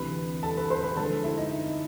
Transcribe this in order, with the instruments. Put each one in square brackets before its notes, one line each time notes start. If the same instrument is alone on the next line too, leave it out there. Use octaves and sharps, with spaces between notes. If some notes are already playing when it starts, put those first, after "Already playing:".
Already playing: [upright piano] D2 C3 E3 B4 B5
A4 A5
B4 B5
C5 C6
B4 B5
D3 F3 G#3 A4 A5
E4 E5
D#4 D#5